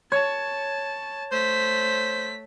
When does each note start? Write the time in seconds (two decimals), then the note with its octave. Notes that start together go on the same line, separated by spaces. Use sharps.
0.12 C#5 A5
1.32 A3 C5 B6